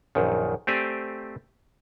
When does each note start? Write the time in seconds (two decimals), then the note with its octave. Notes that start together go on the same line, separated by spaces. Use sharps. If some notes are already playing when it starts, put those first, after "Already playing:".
0.15 A#1 F#2 D#3
0.67 A3 C4 G4 C5 D5 G#5